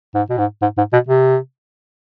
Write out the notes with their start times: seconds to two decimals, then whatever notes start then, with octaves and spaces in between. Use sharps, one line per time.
0.15 G#2
0.30 B2
0.38 G#2
0.62 G#2
0.77 G#2
0.93 B2
1.08 C3